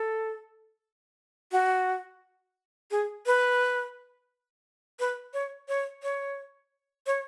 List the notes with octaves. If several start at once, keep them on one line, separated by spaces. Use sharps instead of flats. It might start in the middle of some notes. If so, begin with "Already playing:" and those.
Already playing: A4
F#4
G#4
B4
B4
C#5
C#5
C#5
C#5